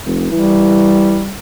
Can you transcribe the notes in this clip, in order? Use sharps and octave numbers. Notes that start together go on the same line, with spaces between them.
F1
E3 G3